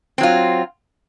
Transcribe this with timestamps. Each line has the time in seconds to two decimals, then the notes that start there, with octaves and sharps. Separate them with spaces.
0.18 C4
0.21 F#3
0.23 F4